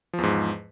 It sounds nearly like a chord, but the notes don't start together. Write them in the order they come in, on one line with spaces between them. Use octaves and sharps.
F3 E2 G#2